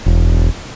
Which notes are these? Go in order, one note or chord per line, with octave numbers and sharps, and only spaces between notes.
E1